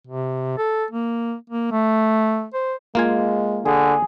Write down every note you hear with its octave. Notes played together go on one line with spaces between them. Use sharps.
C3
A4
A#3
A#3
A3
C5
G#3 A#3 F4 G#5
D3 G#4